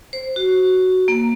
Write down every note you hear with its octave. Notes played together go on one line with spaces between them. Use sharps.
C5
F#4
A#3